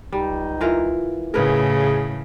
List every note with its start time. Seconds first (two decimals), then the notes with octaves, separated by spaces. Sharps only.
0.12 C#2 G3 D#4
0.61 E3 F4 A#4
1.34 A2 C#3 G#4 A#4 B4